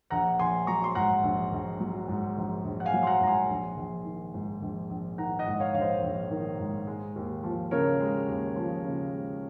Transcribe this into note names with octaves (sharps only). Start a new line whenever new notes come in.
A#1 F#5 A#5
A#1 G#5 C6
F#3 A#5 C#6
C6
G#2 F#5 A#5
A#1
A#1
F#3
G#2
A#1
A#1
F#5
F5 G#5
F#3
C6
F#5 A#5
G#2 A#5
G#5 C6
A#1
A#1
D#3
G#2
A#1
A#1
D#3 F#5 A#5
D#5 F#5
G#2
D#5
C#5 F5
A#1 F5
C5 D#5
A#1
D#3
G#2
G#3
D#2
F3
C#3 A#4 C#5
G#3
D#2
F3
C#3
G#3